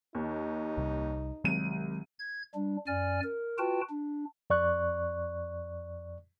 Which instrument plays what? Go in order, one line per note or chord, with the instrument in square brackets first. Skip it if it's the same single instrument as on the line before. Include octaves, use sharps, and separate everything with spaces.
[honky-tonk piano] D#2 [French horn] D#4
[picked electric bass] C2 C3 G3
[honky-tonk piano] C2 D#7 [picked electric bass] D#3 F#3 G#3
[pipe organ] G#6
G3 D4
F#2 D5 G#5 F6
A#4
F4 F#4 B4 G5 A5
D4
[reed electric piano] F2 D5 C#6 F#6